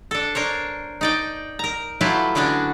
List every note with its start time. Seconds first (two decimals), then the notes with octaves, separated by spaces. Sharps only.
0.11 D4 A4
0.35 D4 A#4 C5 C#5
1.01 D#4 D5 G5
1.59 A#4 A#5
2.01 F#3 A3 E4 F4 G4 B4
2.35 D3 B3 C#4 D4 F#4